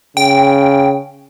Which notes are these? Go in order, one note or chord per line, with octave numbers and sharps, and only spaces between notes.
C#3 G5